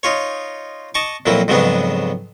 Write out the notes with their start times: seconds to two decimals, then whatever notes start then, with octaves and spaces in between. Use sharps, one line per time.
0.03 D#4 F4 C#5
0.95 D#5 A5 C#6 D6
1.26 F2 A#2 F#3 A#3 E4
1.48 F2 G#2 C#3 F#3 B3 D4